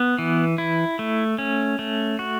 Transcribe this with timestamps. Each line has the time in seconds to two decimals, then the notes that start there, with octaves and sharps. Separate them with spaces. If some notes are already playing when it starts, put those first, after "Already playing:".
Already playing: B3
0.19 E3
0.58 E4
0.99 A3
1.38 C#4
1.79 A3
2.19 F#4